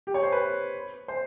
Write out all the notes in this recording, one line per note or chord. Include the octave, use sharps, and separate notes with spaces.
G4
C#5
C5
B4
C5